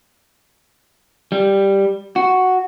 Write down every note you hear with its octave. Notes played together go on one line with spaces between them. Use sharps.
G3
F#4